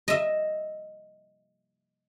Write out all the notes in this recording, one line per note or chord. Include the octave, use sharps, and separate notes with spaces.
D#5 E5